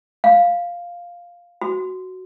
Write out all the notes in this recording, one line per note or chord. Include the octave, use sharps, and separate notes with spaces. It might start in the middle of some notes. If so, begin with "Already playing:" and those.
F5
F#4